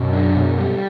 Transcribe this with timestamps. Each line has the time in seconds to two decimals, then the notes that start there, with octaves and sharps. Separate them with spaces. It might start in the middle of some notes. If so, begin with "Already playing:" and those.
Already playing: F#2 B2
0.13 D4
0.36 B2
0.58 G3